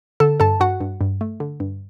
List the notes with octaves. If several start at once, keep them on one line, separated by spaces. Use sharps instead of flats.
D3 A4 A5
G2 A4 A5
G2 F#4 F#5
G2
G2
A3
D3
G2